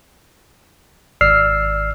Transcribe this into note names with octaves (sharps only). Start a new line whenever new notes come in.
G#1 D5 E6 F6 C7